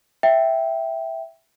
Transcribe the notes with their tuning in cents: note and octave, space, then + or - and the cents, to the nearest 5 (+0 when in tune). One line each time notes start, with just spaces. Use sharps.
E5 +0 G5 +0